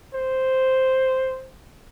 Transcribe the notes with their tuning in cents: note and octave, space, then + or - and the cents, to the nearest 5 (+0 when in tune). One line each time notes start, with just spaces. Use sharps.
C5 +0